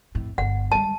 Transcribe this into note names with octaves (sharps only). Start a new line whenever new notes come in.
F2 A2
G1 D4 F#5
G3 G#3 A5